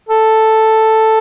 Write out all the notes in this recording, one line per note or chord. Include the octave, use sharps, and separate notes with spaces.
A4